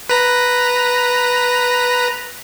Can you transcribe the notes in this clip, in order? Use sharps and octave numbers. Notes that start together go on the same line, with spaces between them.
B4 A#5